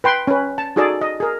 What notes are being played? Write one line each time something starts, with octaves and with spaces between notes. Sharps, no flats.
B4 G5 C6
C#4 B4
A5
D#4 F#4 G#4 A4 D5 A5
D#5
G#4 A#4